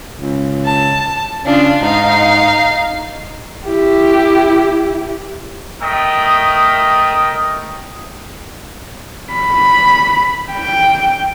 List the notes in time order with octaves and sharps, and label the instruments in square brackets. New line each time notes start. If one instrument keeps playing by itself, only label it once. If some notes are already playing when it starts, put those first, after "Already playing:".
[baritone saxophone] C#2
[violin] A5
[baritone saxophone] C#3 [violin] D4 F4
[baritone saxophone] G#2 [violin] D#4 F5
[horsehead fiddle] E4 G4
[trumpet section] A3 A#4 D#5 G5 D#6
[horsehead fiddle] B5
G5